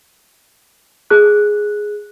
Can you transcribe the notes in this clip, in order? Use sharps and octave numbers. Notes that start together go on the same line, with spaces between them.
G#4 F#6